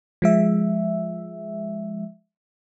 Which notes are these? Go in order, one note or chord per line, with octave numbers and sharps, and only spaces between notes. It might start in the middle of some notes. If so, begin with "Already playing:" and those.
F3 G#3 E5